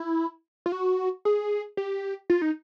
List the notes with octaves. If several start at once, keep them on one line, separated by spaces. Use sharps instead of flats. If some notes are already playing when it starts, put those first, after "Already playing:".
Already playing: E4
F4
F#4
G#4
G4
F4
D#4